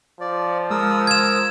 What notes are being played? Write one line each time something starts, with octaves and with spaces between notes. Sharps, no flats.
F3 D5
G#3 A#4 D#6 E6
G#6 E7